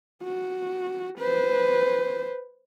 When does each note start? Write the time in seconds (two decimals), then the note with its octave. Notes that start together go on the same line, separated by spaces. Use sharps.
0.23 F#4
1.19 B4 C5